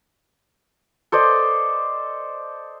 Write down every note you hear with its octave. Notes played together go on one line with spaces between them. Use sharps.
A4 C5 D5 D#5